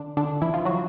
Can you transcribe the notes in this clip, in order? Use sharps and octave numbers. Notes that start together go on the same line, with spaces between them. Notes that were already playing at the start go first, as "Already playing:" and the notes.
Already playing: D3 D4
D3 D4
E3 E4
F3 F4
F#3 F#4